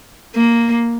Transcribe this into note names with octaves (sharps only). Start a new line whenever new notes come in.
A#3